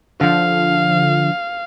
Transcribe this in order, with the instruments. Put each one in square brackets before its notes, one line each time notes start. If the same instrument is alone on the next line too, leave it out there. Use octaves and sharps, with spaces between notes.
[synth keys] D3 F3 [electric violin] F5